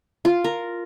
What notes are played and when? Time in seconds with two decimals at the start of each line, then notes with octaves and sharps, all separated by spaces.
0.25 F4
0.44 A#4